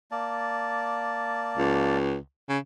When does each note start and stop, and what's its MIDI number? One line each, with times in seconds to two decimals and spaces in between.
0.11 1.98 58
0.11 1.98 74
0.11 1.98 81
1.58 2.16 37
2.49 2.58 49